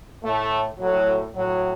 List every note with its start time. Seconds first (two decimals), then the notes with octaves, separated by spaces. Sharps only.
0.23 A2 A3
0.79 A2 F#3
1.35 A2 F#3